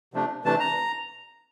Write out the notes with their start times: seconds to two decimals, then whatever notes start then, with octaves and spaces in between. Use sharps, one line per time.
0.14 C3 F3 A3 D4
0.44 C3 E3 A3 D4 A5
0.60 A#5